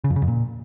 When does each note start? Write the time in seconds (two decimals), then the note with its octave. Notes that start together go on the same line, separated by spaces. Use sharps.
0.04 C#3
0.10 F2
0.16 C#3
0.22 F2
0.28 A#2